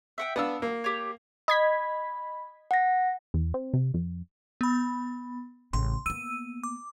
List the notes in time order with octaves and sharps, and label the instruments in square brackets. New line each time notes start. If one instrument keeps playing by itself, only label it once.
[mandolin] E5 F#5 G5
[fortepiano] B3 D4 F5 [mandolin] F#5 A5 E6
[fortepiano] A#3
[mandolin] G4 C#5
[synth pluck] D#5 G#6 B6 [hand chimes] B5
[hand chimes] F#5 A#6
[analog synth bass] E2
C4
C3
F2
[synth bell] B3 B5
[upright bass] A1 C#3 [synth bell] C6
[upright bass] A#3 B3 [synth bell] E6 D#7
[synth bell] D6